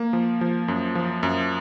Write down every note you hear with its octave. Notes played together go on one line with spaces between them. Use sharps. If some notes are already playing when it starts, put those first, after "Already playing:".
Already playing: A#3
F3
F3
F#2
F3
F#2